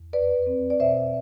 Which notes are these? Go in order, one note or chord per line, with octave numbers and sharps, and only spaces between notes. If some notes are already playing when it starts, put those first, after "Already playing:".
Already playing: E2
F2 B4 D5
C4
D5
B2 C5 E5